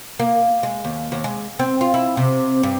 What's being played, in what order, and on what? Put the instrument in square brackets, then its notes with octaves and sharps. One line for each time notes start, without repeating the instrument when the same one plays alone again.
[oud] A#3
G#3
D#2
D#2
G#3
C4
F4
E4
C3
G2